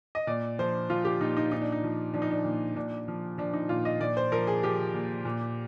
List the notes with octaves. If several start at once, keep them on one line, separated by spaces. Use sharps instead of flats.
D#5
A#2 D5
F3 C5
F3 F4
G4
A#2 D#4
D#4
A#2 D#4
D4
D#4
F3
F3 D4
D#4
D4
A#2
A#2 D4
F3
F3 D4
D#4
A#2 F4
D#5
A#2 D5
C5
F3 A#4
G#4
F3 G4
A#2
A#2